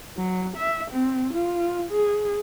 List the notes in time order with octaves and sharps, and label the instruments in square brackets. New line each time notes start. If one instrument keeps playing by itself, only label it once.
[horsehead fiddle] F#3
E5
C4
F4
G#4